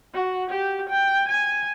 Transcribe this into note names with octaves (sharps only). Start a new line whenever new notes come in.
F#4
G4
G5
G#5